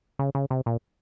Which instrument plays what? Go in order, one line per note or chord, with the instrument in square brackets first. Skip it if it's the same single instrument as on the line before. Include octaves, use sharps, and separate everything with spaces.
[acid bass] C#3
C#3
C3
A#2